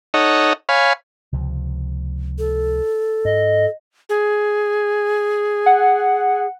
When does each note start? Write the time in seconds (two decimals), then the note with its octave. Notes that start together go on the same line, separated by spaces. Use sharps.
0.14 D#4 A4 C#5 D#5 F#5
0.69 C#5 F5 G#5 B5
1.32 C#2 C3 F3
2.39 A4
3.25 G#2 D#5
4.09 G#4
5.66 F#5